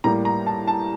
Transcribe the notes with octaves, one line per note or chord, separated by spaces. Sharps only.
A2 G3 A#3 A#5
A#5
A5
A5